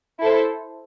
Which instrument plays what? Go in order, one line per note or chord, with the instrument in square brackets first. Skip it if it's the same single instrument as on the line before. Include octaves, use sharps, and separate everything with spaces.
[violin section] E4 A4 C5